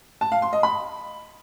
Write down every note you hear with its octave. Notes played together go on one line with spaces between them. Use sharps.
A5
F5
C6
D#5
B5